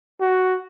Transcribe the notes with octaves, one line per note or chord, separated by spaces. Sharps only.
F#4